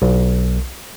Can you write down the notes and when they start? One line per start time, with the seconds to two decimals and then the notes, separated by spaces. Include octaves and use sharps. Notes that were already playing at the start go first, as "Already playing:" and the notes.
0.02 B1